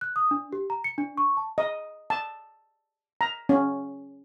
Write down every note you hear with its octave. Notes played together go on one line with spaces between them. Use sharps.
F#6
D#6
D4
G4
A#5
C#7
D4
C#6
A5
D#5
A5
A#5
C#4